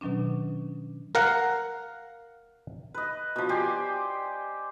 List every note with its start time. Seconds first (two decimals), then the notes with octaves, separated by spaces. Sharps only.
0.01 B2 D#3 F#3 C#4 D4
1.15 A#4 F5 F#5
2.94 B4 D#5
3.36 B2 F3
3.49 G4 C5 D5 G#5